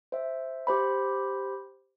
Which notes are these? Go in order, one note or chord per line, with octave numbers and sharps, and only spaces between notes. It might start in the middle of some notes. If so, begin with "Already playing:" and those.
C5 E5
G4 C5 B5